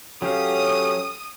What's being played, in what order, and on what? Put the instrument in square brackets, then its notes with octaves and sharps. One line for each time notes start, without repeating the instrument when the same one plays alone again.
[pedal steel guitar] F#3 G4 F5 [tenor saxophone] C#4 [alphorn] A4 [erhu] D#6